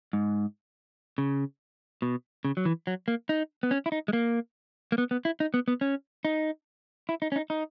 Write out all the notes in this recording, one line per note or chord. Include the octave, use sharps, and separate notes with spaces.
G#2
C#3
B2
C#3
F#3
E3
F#3
A#3
D#4
B3
C#4
E4
D#4
G#3
A#3
A#3
B3
B3
E4
D#4
B3
B3
C#4
D#4
E4
D#4
C#4
D#4
D#4